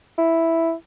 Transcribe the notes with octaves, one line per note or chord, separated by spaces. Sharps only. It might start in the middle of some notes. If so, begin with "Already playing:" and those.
E4